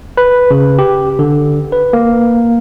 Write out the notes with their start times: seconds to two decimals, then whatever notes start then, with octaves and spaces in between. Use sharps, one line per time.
0.17 B4
0.51 C#3
0.79 G4
1.19 D3
1.72 B4
1.93 A#3